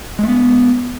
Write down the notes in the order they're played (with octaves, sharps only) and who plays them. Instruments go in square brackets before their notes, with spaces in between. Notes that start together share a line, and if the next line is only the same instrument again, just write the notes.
[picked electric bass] G#3
A3
B3